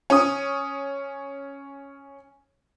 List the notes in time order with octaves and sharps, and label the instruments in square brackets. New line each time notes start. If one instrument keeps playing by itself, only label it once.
[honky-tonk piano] C#4 D#6